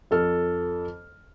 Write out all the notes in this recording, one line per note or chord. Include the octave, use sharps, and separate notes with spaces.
F2 A4 F6